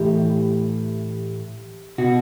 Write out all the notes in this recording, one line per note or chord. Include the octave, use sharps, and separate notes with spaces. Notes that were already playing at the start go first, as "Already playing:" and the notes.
Already playing: A2 E3 G4
B2 F#4